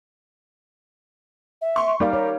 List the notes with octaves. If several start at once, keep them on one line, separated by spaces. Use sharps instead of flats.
E5
C6 C#6
G3 D#4 A#4 D5 F5 D6
A#4 C#5